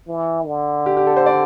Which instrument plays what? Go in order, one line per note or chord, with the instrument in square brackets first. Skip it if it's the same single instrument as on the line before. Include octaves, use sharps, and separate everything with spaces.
[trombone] E3
D3
[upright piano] G4
G4
A4
C5
D5